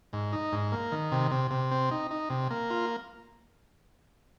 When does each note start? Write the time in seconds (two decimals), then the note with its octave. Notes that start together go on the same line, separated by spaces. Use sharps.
0.13 G#2
0.33 D#4
0.53 G#2
0.72 A#3
0.92 D#3
1.12 C3
1.31 C3
1.51 C3
1.71 C4
1.91 D#4
2.11 D#4
2.30 C3
2.51 A#3
2.70 F4